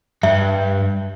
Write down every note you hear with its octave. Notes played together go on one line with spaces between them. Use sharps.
G2 E5